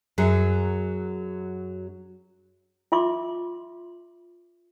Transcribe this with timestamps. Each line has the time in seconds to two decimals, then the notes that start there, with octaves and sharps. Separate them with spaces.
0.18 F#2 F#3 G#4
2.92 F4 E5 C6 D6